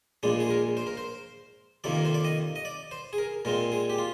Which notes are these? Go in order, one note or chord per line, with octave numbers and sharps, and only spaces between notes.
A#1 A#2 G#3 D4
G#4
A#4
C5
A#4
C5
F2 C3 D#3 A#3 D5
A#4
C5
D5
D#5
D#5
D5
C5
G#4
A#4
A#2 G#3 C4 A#4
G#4
G4
F4